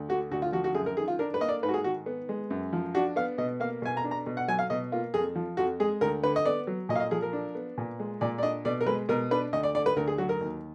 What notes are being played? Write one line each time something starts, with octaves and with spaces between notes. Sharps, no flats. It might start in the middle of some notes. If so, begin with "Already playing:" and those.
Already playing: D2
D3 F#4
D2 F#4
F4
F3 F#4
F#4
F#2 G#4
A#4
D#3 G#4
F4
D4 A#4
B4
A#3 D#5
D5
G#2 B4
F#4
G#4
D#3 F#4
B3
G#3
F#2
F3
D4 F#4
B3 F5
B2 D#5
A#3 F5
B2 G#5
A#5
D4
A#5
B2
F#5
F#3 G#5
F5
B2 D#5
A#3 F4
F2 G#4
F3
F2 F#4
G#3 G#4
D2 A#4
D3 B4
D#5
B3 D5
F#3
A#2 D#5
F5
D#5
F3 G#4
A#4
D4
B3
A#2
G#3
A#2 D5
D5
D4 D#5
B2 D5
A#4
G#3 B4
B2 A#4
D4 B4
D2 D#5
D5
D3 D5
B4
D2 A#4
G#4
F#3 F#4
A#4
D#2